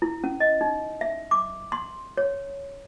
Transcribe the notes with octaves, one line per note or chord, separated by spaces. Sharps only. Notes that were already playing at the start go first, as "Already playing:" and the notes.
E4
C#4
D#5
D#4
E5
D6
C6
C#5